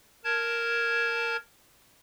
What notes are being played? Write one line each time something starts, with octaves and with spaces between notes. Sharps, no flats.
A#4 A5 G#6